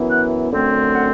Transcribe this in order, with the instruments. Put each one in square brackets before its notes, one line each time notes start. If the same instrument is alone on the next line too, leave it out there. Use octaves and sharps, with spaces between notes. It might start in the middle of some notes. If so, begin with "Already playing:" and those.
Already playing: [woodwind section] F#2 E3 B3
F#5
F#2 D3 A3 C4
F#5